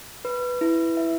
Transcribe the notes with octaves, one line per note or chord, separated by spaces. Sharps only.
B4
E4
E5